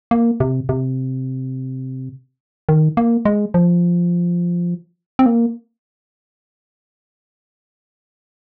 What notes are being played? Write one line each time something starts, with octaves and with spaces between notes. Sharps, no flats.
A#3
C3
C3
D#3
A#3
G#3
F3
C4
A#3